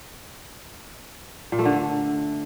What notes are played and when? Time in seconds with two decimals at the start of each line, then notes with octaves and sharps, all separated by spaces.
1.52 A#2
1.59 A3
1.65 D3